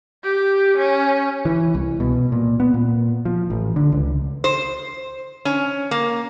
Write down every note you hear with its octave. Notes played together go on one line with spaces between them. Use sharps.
G4
C#4
E3
C2
B2
A#2
B3
A#2
F3
A1
D3
C#2
C5
C#4
A#3